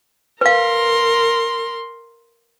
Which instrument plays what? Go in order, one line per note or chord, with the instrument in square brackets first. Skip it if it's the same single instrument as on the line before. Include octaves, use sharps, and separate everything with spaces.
[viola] A#4 C6 [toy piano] B4 F5